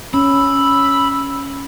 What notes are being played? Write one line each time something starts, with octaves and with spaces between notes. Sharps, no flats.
C#4 B5 E6